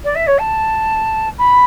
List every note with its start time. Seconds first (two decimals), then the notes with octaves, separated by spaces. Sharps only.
0.05 D5
0.15 E5
0.27 C#5
0.39 A5
1.38 B5